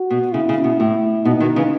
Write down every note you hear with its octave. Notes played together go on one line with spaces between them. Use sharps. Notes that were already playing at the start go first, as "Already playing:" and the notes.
Already playing: F#4
B2
C#3 E4
C#3
B2
A2 E4
B2 D#4
B2 D#3
C#3 E3